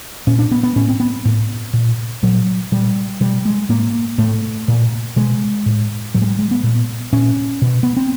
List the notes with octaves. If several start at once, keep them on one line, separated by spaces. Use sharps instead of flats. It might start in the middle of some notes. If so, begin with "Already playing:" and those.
A#2 C#4
D4
B3
B3
A2 C#4
C4
B3
A2
A#2
A#2 F#3
A#2 G3
B2 G3
G#3
A2 A#3
A2 A3
A#2
B2 G#3
A2
A2 F#3
G#3
G3
G#3
B3
A#2
A#2 C#4
B2
B3
C4